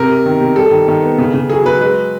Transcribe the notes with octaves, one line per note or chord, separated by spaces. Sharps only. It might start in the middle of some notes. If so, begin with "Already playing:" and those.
Already playing: C3 A#4
C3
D#3
C3
G3 A4
D#3
D#3
B3
C#3
C#3
F#3 G#4
F#3 B4
G#3 B4